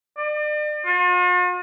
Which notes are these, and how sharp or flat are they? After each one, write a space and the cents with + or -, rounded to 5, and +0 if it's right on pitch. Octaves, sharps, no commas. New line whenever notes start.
D5 +40
F4 +45